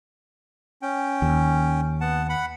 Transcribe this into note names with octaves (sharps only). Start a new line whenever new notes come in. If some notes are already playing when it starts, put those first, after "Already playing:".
C#4 G5
D#2
B3 F#5 A5
F#5 B5